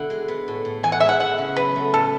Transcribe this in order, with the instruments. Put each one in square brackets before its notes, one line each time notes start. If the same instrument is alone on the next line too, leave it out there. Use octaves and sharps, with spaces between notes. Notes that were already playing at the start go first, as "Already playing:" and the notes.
Already playing: [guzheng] B2 D3 E4 [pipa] F#5
[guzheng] G#3
B3
A2
A2
[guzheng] E3 [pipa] G#5
[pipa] F#5
[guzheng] G#3 [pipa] E5
[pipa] F#5
[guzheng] B3 [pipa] F#5
[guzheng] C#3
[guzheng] F#3 [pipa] B4
[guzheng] A3
[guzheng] A2 [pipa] A4